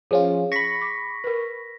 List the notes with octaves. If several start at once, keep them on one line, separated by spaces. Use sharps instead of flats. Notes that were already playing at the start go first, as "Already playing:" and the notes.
F3 C#4 F4 G#4
B5 C#6 A#6 B6
D6
A#4 B4